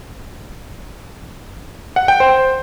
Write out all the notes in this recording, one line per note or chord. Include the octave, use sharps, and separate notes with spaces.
F#5
G5
C5